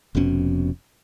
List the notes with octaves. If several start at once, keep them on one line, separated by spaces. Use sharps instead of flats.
F1 F2 B2 C#4